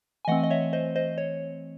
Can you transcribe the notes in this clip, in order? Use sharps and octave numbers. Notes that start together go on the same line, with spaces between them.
G#5
E3 A3 C4 D#5 F#5
D#5
C#5 E5
C5 D#5
C5 D#5
C#5